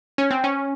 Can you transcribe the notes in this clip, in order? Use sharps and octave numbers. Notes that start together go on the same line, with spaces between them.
C#4
C4
C#4